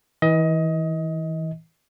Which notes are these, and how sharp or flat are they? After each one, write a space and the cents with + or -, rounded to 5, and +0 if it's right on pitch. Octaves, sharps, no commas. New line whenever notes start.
E3 -30 D#5 +25